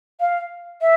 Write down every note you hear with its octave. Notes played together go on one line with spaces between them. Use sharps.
F5
E5